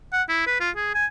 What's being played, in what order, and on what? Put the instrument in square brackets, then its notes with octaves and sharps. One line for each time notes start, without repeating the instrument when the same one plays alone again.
[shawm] F#5
E4
B4
F4
G#4
G#5